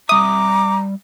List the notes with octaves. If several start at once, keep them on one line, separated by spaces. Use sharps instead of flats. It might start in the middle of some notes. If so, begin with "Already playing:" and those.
G3 E5 A#5 D6 D#6